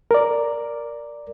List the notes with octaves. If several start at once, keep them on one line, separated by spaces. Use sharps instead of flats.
A#4 D5